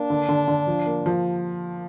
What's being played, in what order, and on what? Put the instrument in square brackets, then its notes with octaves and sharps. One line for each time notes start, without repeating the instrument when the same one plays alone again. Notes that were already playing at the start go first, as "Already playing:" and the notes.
Already playing: [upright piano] A#3 [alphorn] D4
[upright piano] D3
D3
D3
F3
A#3
F3